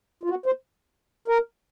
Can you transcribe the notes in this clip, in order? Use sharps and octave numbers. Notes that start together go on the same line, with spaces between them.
F4
F#4
C5
A#4